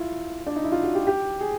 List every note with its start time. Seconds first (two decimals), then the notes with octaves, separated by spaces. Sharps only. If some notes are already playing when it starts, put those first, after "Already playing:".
Already playing: E4 F4
0.47 D4
0.56 D#4
0.64 E4
0.72 F4
0.83 F#4
0.95 G4
1.07 G4
1.41 G#4